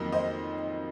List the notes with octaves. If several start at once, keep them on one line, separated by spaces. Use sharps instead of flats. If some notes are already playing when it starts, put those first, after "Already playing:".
Already playing: F2 D#3 F#3 A#3 D#5
C5 D#5